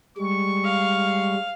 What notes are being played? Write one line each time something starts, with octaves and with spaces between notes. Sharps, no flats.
G3 G#3 C#6
F5